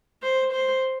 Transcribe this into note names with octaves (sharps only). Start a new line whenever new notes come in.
C5
C5